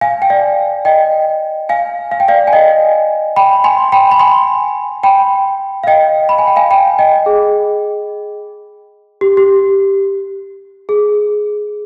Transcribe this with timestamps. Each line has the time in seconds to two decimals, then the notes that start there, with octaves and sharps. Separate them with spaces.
0.01 F5 G#5
0.22 G5
0.30 D5 F5
0.85 D#5 G5
1.69 F5 G#5
2.12 F5
2.20 G5
2.28 D5 F5
2.47 G#5
2.53 D#5 G5
3.36 G5 B5
3.64 G#5 C6
3.92 G5 B5
4.11 B5
4.19 G#5 C6
5.03 G5 B5
5.84 F5
5.87 D#5 G5
6.29 B5
6.38 G#5
6.47 G5
6.56 F5 G#5
6.71 G5 B5
6.99 D#5 G5
7.26 G#4
9.21 G4
9.37 G4
10.89 G#4